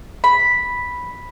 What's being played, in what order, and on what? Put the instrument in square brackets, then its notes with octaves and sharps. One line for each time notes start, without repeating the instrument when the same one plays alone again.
[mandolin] B5